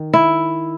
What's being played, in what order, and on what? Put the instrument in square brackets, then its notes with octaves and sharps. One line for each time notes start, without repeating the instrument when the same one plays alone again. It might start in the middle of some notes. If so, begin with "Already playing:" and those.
Already playing: [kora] D#3
E4